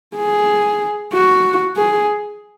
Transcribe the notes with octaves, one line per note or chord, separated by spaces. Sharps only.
G#4
F#4
G#4